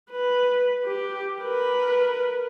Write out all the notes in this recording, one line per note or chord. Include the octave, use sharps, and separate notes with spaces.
B4
G4
A#4 B4